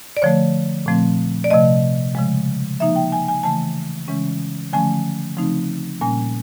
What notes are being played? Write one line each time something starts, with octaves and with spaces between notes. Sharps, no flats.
D5
D3 F3 A3 C#5
A#2 F3 A3 C4
D5
C3 F3 A3 D#5
C#3 F3 G#3
F3 A#3 D#4 E5
G5
G#5
G#5
C#3 E3 A3 A5
C#3 E3 G#3 C#4
D3 F3 A3 C#4 G#5
C#3 F3 A3 C4 D#4
A#2 G3 A#3 C#4 G#5